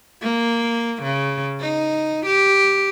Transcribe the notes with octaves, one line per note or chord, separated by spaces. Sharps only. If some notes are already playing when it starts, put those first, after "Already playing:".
A#3
C#3
D#4
G4